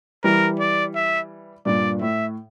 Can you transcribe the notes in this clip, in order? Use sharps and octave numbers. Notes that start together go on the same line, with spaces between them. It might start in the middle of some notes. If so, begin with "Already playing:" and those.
E3 G3 A#4
D5
E5
G2 A#2 D5
A2 E5